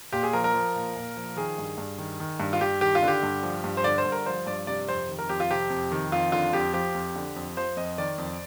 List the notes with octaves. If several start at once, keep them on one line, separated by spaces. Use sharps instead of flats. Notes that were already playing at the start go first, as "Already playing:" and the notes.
A#2 G4
G#4
F3 A#4
A#4
F3
A#2
A#2
F3
D#3 G#4
G2
G2
D#3
D#3
G2
F4
G2 G4
D#3 G4
F4
D3
G4
G2
F3
G2
C5
D3 D5
C5
G2
A#4
F3 C5
G2 D5
C3 D5
F2 C5
D#3
A#4
F2 G4
F4
C3 G4
F2
D#3
F2 F4
D3 F4
F2 G4
F3 G4
F2
D3
F2
F3 C5
F2 D#5
D#3 D5
F2